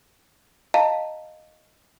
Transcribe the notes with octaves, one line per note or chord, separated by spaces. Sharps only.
D#5 F5 A5 A#5